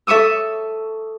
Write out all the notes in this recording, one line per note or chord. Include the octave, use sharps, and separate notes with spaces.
A4 E5 C#6 D#6 E6